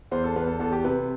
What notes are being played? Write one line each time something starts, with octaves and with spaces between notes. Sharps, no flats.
E2 C5
A4
E2 B4
A4
E2 A4
G4
C3 B4